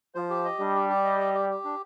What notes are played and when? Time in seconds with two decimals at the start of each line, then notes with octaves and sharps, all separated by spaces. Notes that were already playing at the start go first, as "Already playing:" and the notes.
0.15 F3 C5
0.30 G4
0.45 D#5
0.59 G3 D4
0.75 G4
0.89 G4
1.04 D#5
1.19 G4
1.34 G4
1.50 G4
1.64 D4